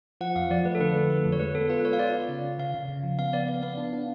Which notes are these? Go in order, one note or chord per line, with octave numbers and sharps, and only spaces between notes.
F3 F#5
F2 F5
F3 D5
A3 B4
A4
D3 B4
A3
A3
F2
C#5
G#3 B4
B3 A4
F4 B4
B3 C#5
F5
F4 D5
F4
C#3
C#3
C#3 F5
C#3
C#3
F3
B3 F5
B3 D5
B3 F5
B3 F5
D4
D4